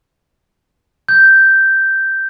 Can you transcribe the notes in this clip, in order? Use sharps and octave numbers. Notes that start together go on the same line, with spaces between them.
G6